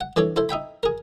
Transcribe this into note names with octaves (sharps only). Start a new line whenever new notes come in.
F#5
E3 D4 A4 C#5 D5
E4 A4 C5
D#4 E5 G5 B5
G#4 A#4